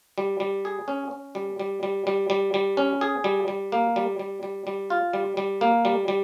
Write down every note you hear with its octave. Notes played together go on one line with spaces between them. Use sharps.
G3
G3
G#4
C#4
C#4
G3
G3
G3
G3
G3
G3
C#4
G#4
G3
G3
A#3
G3
G3
G3
G3
F4
G3
G3
A#3
G3
G3